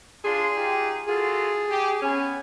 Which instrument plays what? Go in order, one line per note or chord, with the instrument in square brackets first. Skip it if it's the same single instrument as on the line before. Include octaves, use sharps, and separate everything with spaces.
[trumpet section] D4 F4 C6 [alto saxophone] G#4
[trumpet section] D#4 F4 G4
[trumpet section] F4 F#4 A4 [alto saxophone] G#4
[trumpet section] G4
[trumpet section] B3 G#5 [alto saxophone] C#4